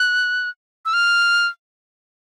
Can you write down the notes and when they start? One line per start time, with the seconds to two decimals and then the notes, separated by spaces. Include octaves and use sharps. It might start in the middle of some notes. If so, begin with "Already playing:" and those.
Already playing: F#6
0.85 E6
0.93 F6